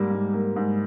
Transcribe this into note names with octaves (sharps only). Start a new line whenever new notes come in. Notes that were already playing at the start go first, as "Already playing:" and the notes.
Already playing: G#2 G3 A#3
G#2
A#3
G#2